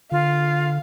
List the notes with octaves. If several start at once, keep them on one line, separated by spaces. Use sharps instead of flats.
D3 F4 F5